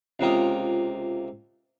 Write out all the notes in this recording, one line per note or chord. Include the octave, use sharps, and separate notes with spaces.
C#2 C3 A#3 F4 D#6